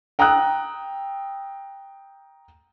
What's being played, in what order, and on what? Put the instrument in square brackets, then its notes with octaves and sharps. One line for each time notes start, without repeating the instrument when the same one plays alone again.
[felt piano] G5 A#5 D#6 E6 F#6